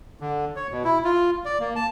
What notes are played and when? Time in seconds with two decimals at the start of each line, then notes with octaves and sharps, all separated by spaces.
0.20 D3
0.56 C#5
0.71 B2
0.84 E4
1.04 F4
1.45 D5
1.60 A#3
1.76 A5